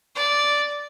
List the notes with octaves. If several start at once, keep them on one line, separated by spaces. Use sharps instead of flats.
D5